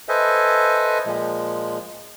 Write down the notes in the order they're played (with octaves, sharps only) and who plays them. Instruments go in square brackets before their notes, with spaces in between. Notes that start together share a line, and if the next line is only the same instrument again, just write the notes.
[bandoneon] A4 B4 C5 D#5 E5 G#5
A#2 F3 G#3